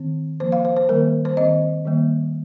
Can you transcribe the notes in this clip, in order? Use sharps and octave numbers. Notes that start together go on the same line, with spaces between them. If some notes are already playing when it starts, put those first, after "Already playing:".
Already playing: D#3 C4
F3 A#3 C5
F5
C5
C5
D#3 G3 A#3 A#4
C5
D#3 C4 D#5
D#3 G3 A#3